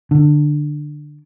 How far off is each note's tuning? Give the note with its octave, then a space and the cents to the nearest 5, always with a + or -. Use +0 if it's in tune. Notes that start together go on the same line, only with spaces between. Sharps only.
D3 +15